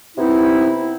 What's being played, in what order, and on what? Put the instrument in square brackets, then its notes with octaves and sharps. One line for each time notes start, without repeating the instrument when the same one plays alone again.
[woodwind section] C3 B3 C4 D#4 E4